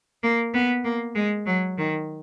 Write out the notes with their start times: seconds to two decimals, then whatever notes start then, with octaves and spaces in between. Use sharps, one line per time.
0.23 A#3
0.54 B3
0.84 A#3
1.15 G#3
1.46 F#3
1.78 D#3